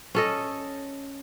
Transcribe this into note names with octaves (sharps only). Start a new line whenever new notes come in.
C#4 A4 D#5